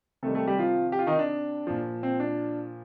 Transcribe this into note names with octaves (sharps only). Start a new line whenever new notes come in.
C3 D#3 G3 A3 A4
A3 A4
G3 G4
F3 F4
G4
F4
D#3 D#4
D4
A#2 F3
C4
D4